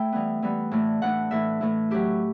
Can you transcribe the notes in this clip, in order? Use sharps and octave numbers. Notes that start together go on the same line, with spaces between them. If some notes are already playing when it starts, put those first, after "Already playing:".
Already playing: A3 E4 G5
E3 G3 B3
E3 G3 B3
A2 E3 A3 D4
A2 E3 A3 D4 F#5
A2 E3 A3 E4 E5
A2 E3 A3 E4
F#3 C#4 E4 G4